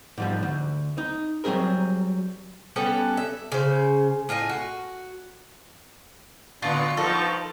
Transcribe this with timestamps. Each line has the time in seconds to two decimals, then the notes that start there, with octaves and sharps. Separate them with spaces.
0.18 G#2 F3 G3
0.43 D2
0.98 D#4
1.44 F#3 G3 C4 G#4 A#4
2.76 G3 B3 C#4 A4
3.17 E5
3.52 C#3 C5
4.29 A2 F4 D#5 G#5
4.49 F#4
6.62 A2 D3 B3 D4 F4 C#6
6.97 F3 G3 B3 D#4 A4